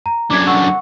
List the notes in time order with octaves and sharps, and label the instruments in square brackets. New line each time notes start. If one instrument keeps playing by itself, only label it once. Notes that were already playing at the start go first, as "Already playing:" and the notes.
[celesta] A#5
[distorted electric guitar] F#2 D3 [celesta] D6 G#6
[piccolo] F#5 [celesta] C#6 E6